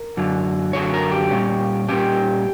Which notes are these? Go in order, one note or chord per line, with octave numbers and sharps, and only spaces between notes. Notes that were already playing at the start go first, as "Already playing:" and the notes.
Already playing: A#4
F#2 D3 F#3
F#2 D3 F#3 C#5
A#4
G4
A#2 G3 C#4
A#2 G3 C#4 G4